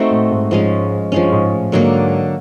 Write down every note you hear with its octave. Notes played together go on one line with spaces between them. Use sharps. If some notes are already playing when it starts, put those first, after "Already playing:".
Already playing: A3 C4 D#4 F#4
A2
G#2
G#2 F3 G#3 C#4
G2 F3 G#3 C#4
G#2
A2
G#2 D3 F#3 A#3